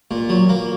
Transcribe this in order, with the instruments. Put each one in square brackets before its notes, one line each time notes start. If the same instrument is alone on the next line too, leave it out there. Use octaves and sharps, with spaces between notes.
[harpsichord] A#2
F#3
A#3